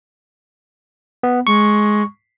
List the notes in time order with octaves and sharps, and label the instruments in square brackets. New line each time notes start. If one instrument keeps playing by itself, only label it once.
[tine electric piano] B3
[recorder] G#3 [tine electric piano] C#6